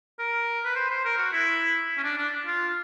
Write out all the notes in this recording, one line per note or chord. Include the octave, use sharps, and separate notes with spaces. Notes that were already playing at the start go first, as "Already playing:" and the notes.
A#4
B4
C5
C5
A#4
F#4
E4
C#4
D4
D4
F4